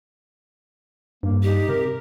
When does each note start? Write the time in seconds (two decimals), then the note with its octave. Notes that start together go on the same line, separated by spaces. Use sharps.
1.23 G2 A#3
1.43 D#4 G4
1.69 C3 A#4